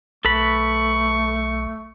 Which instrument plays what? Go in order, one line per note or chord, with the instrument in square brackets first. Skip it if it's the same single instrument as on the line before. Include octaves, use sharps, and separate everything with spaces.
[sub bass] B1 [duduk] A3 [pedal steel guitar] A4 B4 B5 [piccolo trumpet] C#6